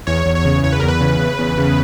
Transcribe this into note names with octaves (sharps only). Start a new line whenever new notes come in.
E2 C#5
E2
C#5
C#3
E2 C#5
B4
E2 A#4
B4
C#3
C#3
E2
C#3